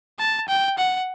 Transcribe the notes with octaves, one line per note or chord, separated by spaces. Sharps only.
A5
G5
F#5